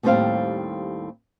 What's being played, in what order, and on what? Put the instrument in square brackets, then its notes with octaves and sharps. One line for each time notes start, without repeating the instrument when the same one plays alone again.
[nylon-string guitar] D#2 A2 G3 C4 C5 F5